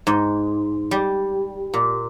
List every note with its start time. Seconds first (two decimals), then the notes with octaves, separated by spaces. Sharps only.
0.07 G#2
0.91 G3
1.74 A#2